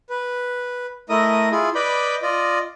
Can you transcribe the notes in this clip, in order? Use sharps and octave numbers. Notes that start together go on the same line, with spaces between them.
B4
A3 E4 A#4 D#5 D#6
E4 F4 G#4
B4 D5 D#5 B5 D6 G6
F4 D5 D#5